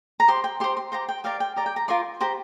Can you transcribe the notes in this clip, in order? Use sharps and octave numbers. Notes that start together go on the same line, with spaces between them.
A#5
G4 C5 C6
G5
G4 C5 C6
C6
G4 C5 A#5
G5
G4 A#4 D5 F5
G5
G4 D5 A#5
G5
A#5
F4 A#4 D5 C6
G4 C5 A#5